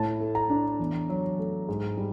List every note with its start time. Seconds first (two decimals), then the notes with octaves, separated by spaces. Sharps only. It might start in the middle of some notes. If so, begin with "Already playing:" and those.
Already playing: A2 A5
0.20 A3
0.35 A#5
0.50 D4
0.79 E2
1.09 F#3
1.39 A3
1.69 G#2
1.97 G3